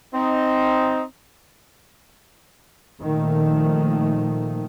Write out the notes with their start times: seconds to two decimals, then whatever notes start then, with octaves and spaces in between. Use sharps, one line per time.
0.14 C4 D#4
3.02 A#2 D#3 F3 A3